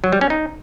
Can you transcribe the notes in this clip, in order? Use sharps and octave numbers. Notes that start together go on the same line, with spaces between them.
F#3
G3
C#4
D#4